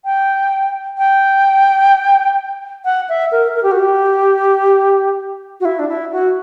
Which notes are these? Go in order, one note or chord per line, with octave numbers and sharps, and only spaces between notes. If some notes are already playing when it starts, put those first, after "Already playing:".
G5
G5
F#5
E5
A#4
A#4
G4
F#4
G4
F#4
E4
D4
E4
F#4